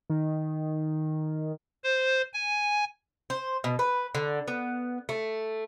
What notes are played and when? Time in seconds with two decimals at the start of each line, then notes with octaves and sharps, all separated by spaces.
0.10 D#3
1.84 C5
2.33 G#5
3.30 C5
3.64 B2
3.79 B4
4.15 D3
4.48 B3
5.09 A3